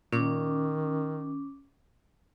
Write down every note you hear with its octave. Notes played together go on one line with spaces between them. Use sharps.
A#2 D#3 C#4 D6